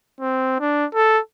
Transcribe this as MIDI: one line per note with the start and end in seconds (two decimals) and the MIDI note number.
0.20 0.59 60
0.60 0.85 62
0.94 1.19 69